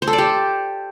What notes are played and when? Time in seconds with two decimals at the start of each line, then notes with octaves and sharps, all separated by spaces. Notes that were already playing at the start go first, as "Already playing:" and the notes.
0.02 C5
0.07 A4
0.13 D5
0.18 G4